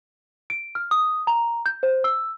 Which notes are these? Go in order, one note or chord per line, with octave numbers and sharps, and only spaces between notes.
D7
F6
D#6
A#5
G6
C5
E6